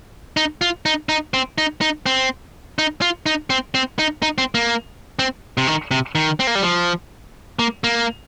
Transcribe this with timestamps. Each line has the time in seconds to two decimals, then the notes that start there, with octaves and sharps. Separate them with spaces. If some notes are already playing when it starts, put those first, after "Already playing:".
0.37 D#4
0.61 F4
0.86 D#4
1.09 D#4
1.34 C4
1.58 D#4
1.81 D#4
2.06 C4
2.79 D#4
3.02 F4
3.26 D#4
3.50 C4
3.75 C4
3.99 D#4
4.22 D#4
4.38 C4
4.55 A#3
5.19 C4
5.58 C3
5.67 D#3
5.91 C3
6.15 D#3
6.40 C4
6.47 A#3
6.55 G3
6.63 F3
7.59 A#3
7.84 A#3